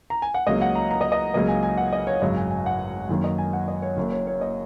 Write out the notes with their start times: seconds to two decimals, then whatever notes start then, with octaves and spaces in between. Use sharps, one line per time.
0.10 A#5
0.22 G#5
0.34 F#5
0.47 C#2 C#3 F#3 A#3 D#5
0.62 F#5
0.75 A#5
0.91 A#5
1.01 D#5
1.12 D#5
1.34 C#2 C#3 F#3 A#3 D#5
1.48 G#5
1.63 G#5
1.77 F#5
1.93 D#5
2.07 C#5
2.22 G#1 F#2 C#3 F#3 D#5
2.37 G#5
2.51 G#5
2.66 F#5
3.09 F#2 D#3 F#3 A#3
3.24 D#5
3.38 G#5
3.53 F#5
3.68 D#5
3.82 C#5
3.97 F#1 F#2 F#3 A#3
4.12 C#5
4.27 C#5
4.41 D#5